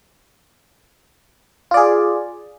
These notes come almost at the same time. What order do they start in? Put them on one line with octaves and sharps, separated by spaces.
F4 D5 G#4